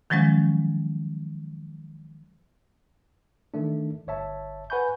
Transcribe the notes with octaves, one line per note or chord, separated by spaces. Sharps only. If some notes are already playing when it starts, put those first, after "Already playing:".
D#3 F3 F#3 G#3 C#4
D#3 E3 A3 D4
G1 C#5 E5 A5
B4 F#5 G#5 B5 C#6 G6